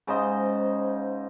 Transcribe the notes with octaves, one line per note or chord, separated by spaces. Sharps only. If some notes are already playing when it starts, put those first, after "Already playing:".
G#2 C#3 C5 D#5